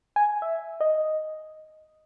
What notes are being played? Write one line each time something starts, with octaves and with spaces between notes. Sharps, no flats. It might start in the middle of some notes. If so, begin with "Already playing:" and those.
G#5
E5
D#5